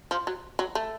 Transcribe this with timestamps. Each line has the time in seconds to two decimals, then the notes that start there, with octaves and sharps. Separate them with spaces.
0.11 F3
0.27 F#3
0.59 F#3
0.75 A3